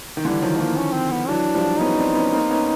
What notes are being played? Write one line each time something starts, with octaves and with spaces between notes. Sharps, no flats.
D#3
D3 E3 G3
D#3 F3 F#3
D#3 F3 A#3
C#4
C4
B3
E3 F#3 D4
F3 G3
B3 C#4 D#4
C4 D4
B3 C#4
A#3 C4
B3 C#4